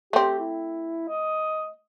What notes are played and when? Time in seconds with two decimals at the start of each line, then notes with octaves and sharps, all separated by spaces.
0.13 A3 C4 G4
0.40 E4
1.08 D#5